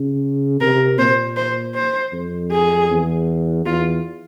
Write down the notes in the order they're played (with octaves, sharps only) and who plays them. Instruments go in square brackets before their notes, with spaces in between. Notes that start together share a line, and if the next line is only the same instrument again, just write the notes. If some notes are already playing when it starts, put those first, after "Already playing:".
Already playing: [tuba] C#3
[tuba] C3 [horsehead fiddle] A#4
[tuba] A#2 [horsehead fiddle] C5
[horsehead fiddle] C5
C5
[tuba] F2
[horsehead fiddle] G#4
[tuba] E2
[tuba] E2 [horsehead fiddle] F4